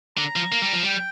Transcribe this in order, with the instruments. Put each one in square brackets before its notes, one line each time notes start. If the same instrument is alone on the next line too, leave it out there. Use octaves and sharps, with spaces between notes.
[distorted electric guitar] D3 [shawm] A#5
[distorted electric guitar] F3
A#3
G3
F3
[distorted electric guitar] G3 [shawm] G5